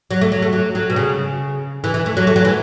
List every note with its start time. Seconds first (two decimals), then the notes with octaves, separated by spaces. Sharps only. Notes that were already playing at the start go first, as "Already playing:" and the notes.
0.11 F#3
0.21 A3
0.32 F#3
0.42 A3
0.53 F#3
0.75 F#3
0.90 B2
0.96 C#3
1.84 E3
1.94 E3
2.06 A3
2.17 F#3
2.27 A3
2.36 F#3
2.45 E3